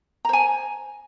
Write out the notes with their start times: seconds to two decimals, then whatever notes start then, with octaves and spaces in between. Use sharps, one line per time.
0.25 A#5
0.29 C5
0.33 G#5